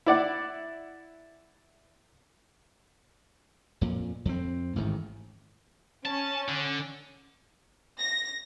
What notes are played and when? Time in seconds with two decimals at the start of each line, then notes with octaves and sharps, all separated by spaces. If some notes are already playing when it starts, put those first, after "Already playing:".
0.06 E4 D5 F#5
3.81 F2 A#2
4.25 F2 C4
4.76 A1 G#2 D#3
6.05 C#4 A5
6.48 D3
7.98 A#6